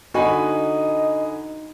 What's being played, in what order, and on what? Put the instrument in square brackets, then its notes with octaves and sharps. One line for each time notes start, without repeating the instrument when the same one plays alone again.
[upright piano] D3 G#5 B5 [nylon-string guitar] D#4 [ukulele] F#4 [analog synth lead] D#5